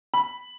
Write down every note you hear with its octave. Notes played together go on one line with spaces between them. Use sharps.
B5